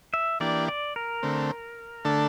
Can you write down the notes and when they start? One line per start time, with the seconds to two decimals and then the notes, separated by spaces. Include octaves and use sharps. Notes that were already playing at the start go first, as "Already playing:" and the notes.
0.14 E5
0.40 E3 A#3 D4 G4 D5
0.68 D5
0.96 A#4
1.23 D3 A3 C4
2.05 D3 A3 D4 A4